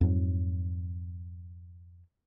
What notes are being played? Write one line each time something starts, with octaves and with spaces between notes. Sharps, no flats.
F2 G#2 F#3